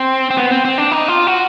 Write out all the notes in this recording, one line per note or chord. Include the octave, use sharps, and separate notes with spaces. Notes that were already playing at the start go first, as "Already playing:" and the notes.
Already playing: C4
C4
B3
C4
C4
D4
D#4
F4
F#4